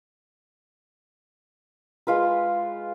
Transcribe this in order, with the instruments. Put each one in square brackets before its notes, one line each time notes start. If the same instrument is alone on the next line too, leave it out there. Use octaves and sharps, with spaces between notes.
[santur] G#3 F4 B4